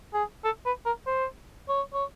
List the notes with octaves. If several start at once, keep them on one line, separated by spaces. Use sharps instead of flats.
G#4
A4
B4
A#4
C5
C#5
C#5